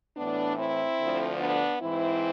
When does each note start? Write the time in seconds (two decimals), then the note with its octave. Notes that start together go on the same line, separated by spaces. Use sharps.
0.16 A2 E3 B3 D4
0.57 C4 E4
0.98 D2 D3 F3
1.39 B3 D4
1.80 G#2 E3 C4 E4